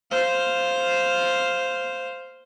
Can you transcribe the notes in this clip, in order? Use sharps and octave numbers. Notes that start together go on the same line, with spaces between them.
C5 F5